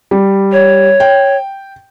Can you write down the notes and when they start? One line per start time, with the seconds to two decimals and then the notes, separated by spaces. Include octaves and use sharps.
0.11 G3
0.52 C#5
1.00 G5